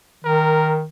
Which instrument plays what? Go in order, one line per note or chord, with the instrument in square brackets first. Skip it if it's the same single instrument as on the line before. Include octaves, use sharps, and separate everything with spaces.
[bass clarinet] D#3 [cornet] A#4